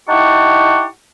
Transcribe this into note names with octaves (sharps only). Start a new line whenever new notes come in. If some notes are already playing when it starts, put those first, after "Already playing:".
D#4 E4 G4 F#5 A5 C#6